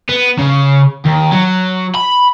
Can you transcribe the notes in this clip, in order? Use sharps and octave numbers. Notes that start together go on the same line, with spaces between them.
B3
C#3
D#2
F#3
B5